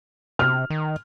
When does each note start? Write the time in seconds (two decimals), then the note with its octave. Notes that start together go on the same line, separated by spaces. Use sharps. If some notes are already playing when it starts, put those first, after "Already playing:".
0.39 C3 F6
0.70 D#3